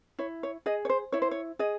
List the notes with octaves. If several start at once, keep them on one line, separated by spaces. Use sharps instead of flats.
E4 C#5
C#5
G#4 D#5
C#5
C5
E4 C#5
C5
C#5
G#4 D#5